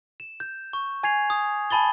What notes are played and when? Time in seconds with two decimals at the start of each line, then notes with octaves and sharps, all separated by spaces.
0.20 E7
0.40 G6
0.73 C#6
1.03 G#5 G#6 C7 F7
1.30 D#6
1.71 G#5 A5 B5 A6 G7